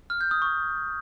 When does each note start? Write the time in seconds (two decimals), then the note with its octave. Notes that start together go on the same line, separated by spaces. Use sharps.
0.10 F6
0.21 G6
0.31 D#6
0.42 C#6